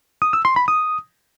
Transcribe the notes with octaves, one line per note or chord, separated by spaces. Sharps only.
D#6
E6
C6
B5
D#6